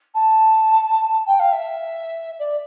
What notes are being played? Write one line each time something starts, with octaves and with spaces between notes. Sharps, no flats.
A5
G5
F5
E5
D5